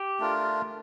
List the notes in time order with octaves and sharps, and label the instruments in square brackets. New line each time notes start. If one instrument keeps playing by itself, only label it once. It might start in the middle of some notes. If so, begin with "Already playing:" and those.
Already playing: [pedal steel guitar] G4
[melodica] A3 D4 F4 A#4